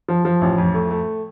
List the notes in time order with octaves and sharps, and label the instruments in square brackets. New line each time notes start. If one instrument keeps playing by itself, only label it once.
[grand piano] F3
F3
A1
F2
A3
A3